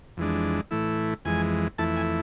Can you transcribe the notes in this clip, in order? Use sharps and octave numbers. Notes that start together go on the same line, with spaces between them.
F2 E3 G#3 D4
A2 E3 A3 E4
F2 E3 G#3 G#5
F2 E3 A3 E4 A5
G#5